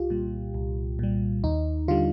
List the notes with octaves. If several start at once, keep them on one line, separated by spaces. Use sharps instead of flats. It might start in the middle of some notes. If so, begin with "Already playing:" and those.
Already playing: C2 F4 G4
A#2 G3
C2
A#2 G3
D#2 D#4
D3 G3 F4